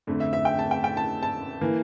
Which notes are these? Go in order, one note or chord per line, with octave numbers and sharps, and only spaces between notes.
F2 D3 A3
E5
E5
G5
A5
G5
G5
A5
A5
E3 A#3